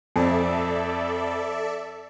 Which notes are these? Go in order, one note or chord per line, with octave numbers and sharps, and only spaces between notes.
F2 A4 D5 E5